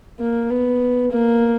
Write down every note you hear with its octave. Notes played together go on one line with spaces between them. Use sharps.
A#3
B3
A#3